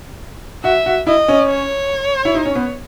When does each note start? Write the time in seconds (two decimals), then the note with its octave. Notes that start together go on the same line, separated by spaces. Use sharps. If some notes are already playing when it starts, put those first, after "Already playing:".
0.64 F#4 E5
0.86 F#4
1.06 E4 D#5
1.28 C#4
1.49 C#5
2.25 E4
2.35 D#4
2.45 C#4
2.55 B3